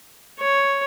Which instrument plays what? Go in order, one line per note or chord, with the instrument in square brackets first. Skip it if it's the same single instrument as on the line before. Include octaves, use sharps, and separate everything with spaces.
[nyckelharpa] C#5